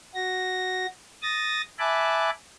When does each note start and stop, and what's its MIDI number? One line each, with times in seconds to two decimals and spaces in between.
0.15 0.86 66
0.15 0.86 94
1.23 1.62 87
1.23 1.62 93
1.23 1.62 94
1.79 2.30 76
1.79 2.30 80
1.79 2.30 81
1.79 2.30 83
1.79 2.30 86
1.79 2.30 90